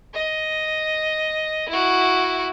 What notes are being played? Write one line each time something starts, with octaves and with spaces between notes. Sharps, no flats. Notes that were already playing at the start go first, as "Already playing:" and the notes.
D#5
E4 F#4